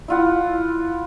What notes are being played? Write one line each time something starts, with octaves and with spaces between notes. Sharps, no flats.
E4 F4 F#5